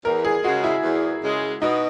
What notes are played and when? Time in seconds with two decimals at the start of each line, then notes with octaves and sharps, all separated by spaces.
0.04 E2 A#4
0.25 G#4
0.44 C#3 G#3 F#4
0.64 E4
0.83 E2
1.23 C#3 G#3
1.62 B2 D#4